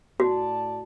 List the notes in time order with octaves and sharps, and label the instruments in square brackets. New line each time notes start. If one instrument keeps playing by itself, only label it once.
[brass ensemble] A2 D5 A5 [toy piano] F#4